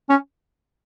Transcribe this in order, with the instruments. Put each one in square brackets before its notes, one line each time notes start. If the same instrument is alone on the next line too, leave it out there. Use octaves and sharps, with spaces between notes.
[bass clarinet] C#4